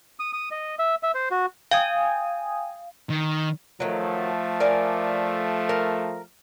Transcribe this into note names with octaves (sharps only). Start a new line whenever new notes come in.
D#6
D#6
D#5
E5
E5
C5
F#4
F5 G5 G#5 D#6
D#3
D#3 F3 F#3 A3
A#4 D5 G#5
A#4